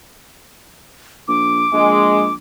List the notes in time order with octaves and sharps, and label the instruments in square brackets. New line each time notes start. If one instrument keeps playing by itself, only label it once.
[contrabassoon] A#1 [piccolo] D6
[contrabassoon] A#1 [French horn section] G#3